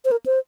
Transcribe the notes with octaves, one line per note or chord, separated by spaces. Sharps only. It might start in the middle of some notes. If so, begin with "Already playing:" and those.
C5
A#4
C5